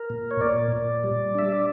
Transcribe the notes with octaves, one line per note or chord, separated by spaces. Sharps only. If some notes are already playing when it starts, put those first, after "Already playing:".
Already playing: A#4
A#2
C#5
A#2 D5
A#2
G3
D4 E5
D5